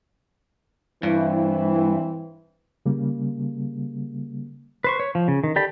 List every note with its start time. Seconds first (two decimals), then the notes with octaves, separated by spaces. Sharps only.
1.03 G2 E3 C4 E4
2.86 C#3 G3 A#3
4.84 B4 C5 C#6
5.00 C#5
5.15 F3
5.28 C#3
5.44 D#3
5.56 G4 A4 D5 B5